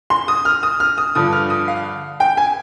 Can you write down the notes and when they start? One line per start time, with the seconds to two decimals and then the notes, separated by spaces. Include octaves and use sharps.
0.10 C6
0.28 D#6
0.45 F6
0.63 D#6
0.80 F6
0.98 D#6
1.15 G2 D3 F3 D#6
1.33 F6
1.50 D#6
1.68 F5
2.20 G5
2.37 G#5